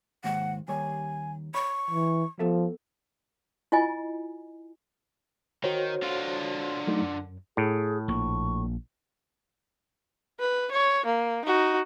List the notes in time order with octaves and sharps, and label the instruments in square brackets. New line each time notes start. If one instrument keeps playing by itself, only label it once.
[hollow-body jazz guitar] D#2 G#2 [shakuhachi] F#5
[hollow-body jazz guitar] D#2 G3 C#5 [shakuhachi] G#5
[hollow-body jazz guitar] C#5 B5 [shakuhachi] C#6
[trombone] E3
[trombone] F3 [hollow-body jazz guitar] B3 A4 E5
[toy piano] E4 F4 D#5 G#5
[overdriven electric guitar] D#3 [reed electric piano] F#4 C5 C#5
[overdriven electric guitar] D3 F4
[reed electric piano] F#3 A3 D#4
F#2
[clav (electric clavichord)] A2 [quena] G#4
[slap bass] A#1 A#3 [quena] C#6
[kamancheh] B4
C#5
A#3
D#4 F#4